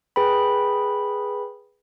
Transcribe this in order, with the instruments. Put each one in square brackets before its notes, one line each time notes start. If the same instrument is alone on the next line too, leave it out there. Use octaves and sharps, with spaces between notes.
[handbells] G#4 B4 G5 B5